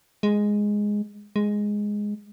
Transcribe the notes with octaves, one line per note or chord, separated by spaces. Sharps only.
G#3
G#3